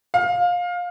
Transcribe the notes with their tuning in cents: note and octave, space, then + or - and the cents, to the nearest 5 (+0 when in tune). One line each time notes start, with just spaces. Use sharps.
F5 +20